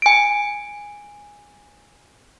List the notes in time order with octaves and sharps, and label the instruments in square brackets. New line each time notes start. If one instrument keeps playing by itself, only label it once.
[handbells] G#5 D7